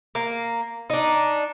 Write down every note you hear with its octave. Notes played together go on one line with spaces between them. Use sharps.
A#3
D4 D#4